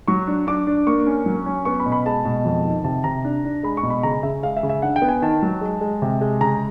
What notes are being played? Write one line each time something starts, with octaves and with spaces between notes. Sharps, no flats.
F#3 C#6
D4
D4 D6
D4
A#3 C#6
C#4
F#3
C#4
B3 C#6
B5
B2
B5
G#3 A5
B2
F2
D#3
C3 A5
C3 A#5
D4
D4
G#3 B5
C#6
B2
B5
C#3 A#5
C#3 E5
G#3 F5
E5
C#3
E5
D4 F#5
G5
B3
G#5
D#3 A5
F#3
G#3
G#3
C3
G#3
C#3 A#5